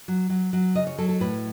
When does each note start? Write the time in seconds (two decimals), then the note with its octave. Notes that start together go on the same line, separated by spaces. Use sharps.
0.08 F#3
0.30 F#3
0.53 F#3
0.75 C#3 D#5
0.87 C#5
0.98 F#3 A4
1.09 A4
1.20 A2 B4